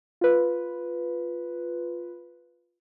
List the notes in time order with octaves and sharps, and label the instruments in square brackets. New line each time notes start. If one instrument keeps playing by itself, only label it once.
[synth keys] F4 B4